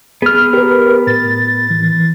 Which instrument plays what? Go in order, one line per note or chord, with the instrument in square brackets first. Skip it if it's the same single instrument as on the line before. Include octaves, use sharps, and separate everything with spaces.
[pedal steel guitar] B3 F6 [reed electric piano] G#4
[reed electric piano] G4 B4 [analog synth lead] A#4
[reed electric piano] A2 [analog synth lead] A6
[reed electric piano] E3